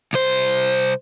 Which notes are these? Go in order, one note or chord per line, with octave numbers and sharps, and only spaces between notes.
C2 C5